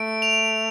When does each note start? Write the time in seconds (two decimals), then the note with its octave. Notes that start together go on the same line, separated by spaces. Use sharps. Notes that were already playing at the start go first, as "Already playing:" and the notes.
Already playing: A3 D7
0.22 F7